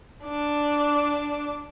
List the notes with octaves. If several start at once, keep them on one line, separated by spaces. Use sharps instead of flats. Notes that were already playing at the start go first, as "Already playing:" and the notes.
D4 D6